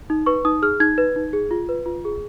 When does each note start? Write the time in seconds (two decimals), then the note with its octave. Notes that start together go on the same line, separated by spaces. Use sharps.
0.10 D#4
0.26 B4 C#6
0.45 D#4 D#6
0.62 G#4 F6
0.80 D#4 G#6
0.98 B4
1.16 D#4
1.33 G#4
1.51 F4
1.69 B4
1.86 F4
2.05 G#4